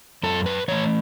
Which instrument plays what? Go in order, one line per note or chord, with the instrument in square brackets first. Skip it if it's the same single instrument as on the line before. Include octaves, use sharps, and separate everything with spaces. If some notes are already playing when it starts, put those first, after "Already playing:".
[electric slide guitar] F#2 A4
B4
E3 A3 C#5